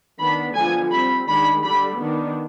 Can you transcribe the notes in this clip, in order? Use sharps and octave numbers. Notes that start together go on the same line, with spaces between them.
D#3 B3 D4 B5
D3 F3 G#3 B3 G#5
G3 C4 B5
D#3 G#3 D4 B5
D3 G3 D4 B5
D#3 B3 D4